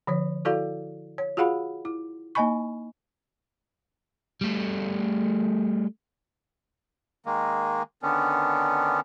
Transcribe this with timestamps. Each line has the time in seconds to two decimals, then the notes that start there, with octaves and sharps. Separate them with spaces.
0.07 D3 F3 C#5
0.45 E4 F#4 A4 D5 F5
1.18 C#5
1.37 F4 F#4 G#4 F5 F#5 B5
1.85 E4
2.35 A#3 D#4 D#5 G#5 B5 C#6
4.41 G3 A3
7.26 D#3 G#3 A#3
8.03 D3 D#3 B3 C#4 D4